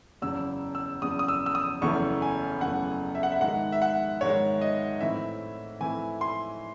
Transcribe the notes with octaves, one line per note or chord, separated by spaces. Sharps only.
F#1 E2 C#3 E6
E6
F#1 E2 C#3 D#6
D#6
E6
E6
D#6
F#1 E2 C#3 E3 A3 C#6
G#5
F#1 E2 C#3 E3 A3 F#5
E5
F#5
E5
G#2 D#3 G#3 F#5
E5
F#5
G#2 D#3 G#3 C#5
D#5
A2 E3 C4 E4 E5
A2 E3 C4 E4 G#5
C6